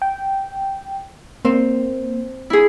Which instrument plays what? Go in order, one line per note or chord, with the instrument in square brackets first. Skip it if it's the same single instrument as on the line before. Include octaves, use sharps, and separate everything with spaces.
[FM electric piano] G5
[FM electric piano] A#3 [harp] C4
[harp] E4 G#4